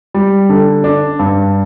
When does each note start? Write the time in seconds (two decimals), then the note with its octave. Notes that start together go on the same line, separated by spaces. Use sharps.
0.14 G3
0.49 D3
0.84 D4
1.19 G2